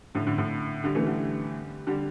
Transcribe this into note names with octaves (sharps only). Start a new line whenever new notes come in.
A2 D3
A2 D3
A2 D3
D3 G3
E3 A3
D3 G3
D3 G3